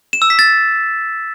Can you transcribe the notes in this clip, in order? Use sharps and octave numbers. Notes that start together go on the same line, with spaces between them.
E7
E6
B6
A6